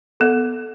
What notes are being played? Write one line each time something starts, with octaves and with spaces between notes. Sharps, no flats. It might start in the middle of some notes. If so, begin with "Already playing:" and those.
B3 A4